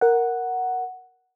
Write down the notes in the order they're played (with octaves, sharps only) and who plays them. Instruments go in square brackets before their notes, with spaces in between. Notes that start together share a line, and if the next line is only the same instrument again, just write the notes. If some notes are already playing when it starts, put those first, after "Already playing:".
[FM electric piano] A#4 F#5